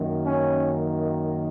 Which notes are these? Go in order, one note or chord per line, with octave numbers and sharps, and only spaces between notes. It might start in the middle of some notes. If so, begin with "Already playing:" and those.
Already playing: F#2 D#3 A#3
C#4